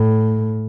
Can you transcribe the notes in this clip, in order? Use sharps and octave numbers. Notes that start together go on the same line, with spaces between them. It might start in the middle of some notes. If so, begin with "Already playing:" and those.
Already playing: A2